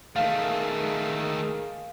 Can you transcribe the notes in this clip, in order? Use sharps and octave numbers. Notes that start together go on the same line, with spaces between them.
D#3 A3 G#4 A#4 F5